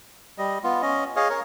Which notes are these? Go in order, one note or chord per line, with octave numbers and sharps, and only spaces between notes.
G3 D#5
B3 F4
C#4 D#5
G#4 C#5 D#5 F5
A#4 C#5